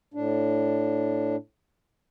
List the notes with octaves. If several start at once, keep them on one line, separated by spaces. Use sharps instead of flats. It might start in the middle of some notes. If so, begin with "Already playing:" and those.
A2 D4